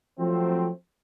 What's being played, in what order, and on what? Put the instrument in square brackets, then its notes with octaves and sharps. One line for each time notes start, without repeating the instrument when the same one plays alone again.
[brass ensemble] F3 F#3 A3 C4